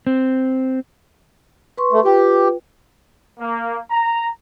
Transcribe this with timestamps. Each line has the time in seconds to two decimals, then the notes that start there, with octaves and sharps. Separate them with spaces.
0.07 C4
1.78 B4 C6 C#6
1.92 A3
2.05 F4 G4 B4 G5
3.39 A#3
3.90 A#5